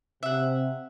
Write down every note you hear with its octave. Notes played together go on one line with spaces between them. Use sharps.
C3 E5 F#5